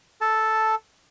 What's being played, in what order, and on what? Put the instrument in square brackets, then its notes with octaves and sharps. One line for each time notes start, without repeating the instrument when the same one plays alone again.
[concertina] A4 A5